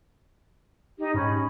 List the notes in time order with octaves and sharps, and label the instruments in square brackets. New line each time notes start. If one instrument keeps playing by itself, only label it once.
[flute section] D#4 G4
[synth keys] G#2 [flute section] C#4 B5